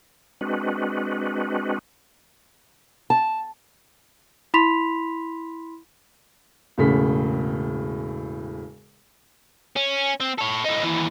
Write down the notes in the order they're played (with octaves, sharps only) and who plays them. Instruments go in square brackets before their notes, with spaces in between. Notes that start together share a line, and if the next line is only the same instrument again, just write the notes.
[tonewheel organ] G#3 C4 D4 F#4 B4
[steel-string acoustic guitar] A5
[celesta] E4 B5 C6 B6 F7
[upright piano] E1 A2 C#3 B6
[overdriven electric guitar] C#4
C4
A4 C#5
A2 D#4
D#2 E3